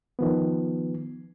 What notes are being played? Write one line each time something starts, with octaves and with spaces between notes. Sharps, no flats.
D#3 F3 B3